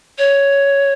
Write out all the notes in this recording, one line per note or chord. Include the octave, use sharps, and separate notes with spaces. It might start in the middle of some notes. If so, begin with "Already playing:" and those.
C#5